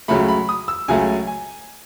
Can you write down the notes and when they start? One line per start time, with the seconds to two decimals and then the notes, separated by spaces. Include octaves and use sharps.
0.08 C#2 C#3 F#3 A3 B5
0.29 B5
0.49 D#6
0.68 E6
0.88 C#2 C#3 F#3 A3 G#5
1.27 G#5